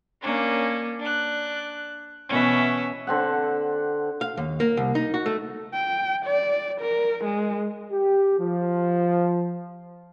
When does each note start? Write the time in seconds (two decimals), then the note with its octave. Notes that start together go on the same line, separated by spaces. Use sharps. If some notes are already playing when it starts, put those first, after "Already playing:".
0.22 A#3 C#4 D4
1.00 D4 F#6
2.30 B2 E3 C#4 E5
3.07 D3 C4 F#5
4.21 F5
4.37 D#2
4.60 A#3
4.77 C2
4.95 D#4
5.14 F#4
5.26 A3
5.73 G5
6.26 D5
6.81 A#4
7.24 G#3
7.92 G4
8.40 F3